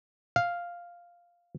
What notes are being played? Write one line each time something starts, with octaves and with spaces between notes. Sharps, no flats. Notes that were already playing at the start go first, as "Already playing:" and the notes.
F5